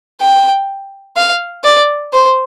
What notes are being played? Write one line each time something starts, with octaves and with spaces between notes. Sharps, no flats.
G5
F5
D5
C5